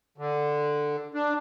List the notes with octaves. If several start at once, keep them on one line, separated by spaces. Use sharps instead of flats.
D3
D4